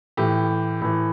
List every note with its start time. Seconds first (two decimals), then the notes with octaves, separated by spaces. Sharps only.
0.17 A2 E3 G4
0.82 A2 E3